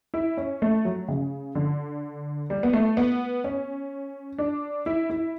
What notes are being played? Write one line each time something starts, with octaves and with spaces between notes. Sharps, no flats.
E4
C#4
A3
F#3
C#3
D3
G3
B3
A3
B3
C#4
D4
E4
E4